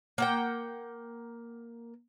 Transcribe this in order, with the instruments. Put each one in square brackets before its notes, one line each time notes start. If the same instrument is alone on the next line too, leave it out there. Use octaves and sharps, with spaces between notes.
[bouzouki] A#3 F#5 G5